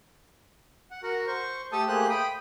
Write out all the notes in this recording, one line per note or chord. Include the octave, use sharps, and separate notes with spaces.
F#5
F#4 A#4 F#5
C5 C#6
A3 G4 A4 A5 D#6 E6
A3 A#3 G4 G#4 C5 F#6
G5 B5 D#6